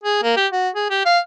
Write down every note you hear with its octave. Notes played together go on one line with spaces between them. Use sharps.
G#4
A#3
G4
F#4
G#4
G4
F5